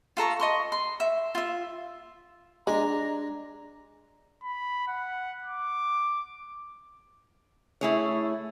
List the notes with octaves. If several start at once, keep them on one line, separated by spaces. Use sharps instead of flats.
F4 A4 A#5 C#6
D#5 C6 C#6
C6
E5
F4 E5
G#3 D4 G#5 A#5
B5
F#5
D6
A3 E4 G#4 C#5